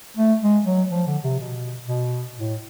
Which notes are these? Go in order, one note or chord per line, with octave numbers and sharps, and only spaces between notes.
A3
G#3
F#3
F3
D3
C3
B2
B2
A2